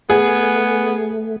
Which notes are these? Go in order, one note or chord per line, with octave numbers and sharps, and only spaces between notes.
A3 B3 G#4